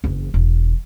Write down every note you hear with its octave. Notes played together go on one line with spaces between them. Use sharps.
F#1 E2
E1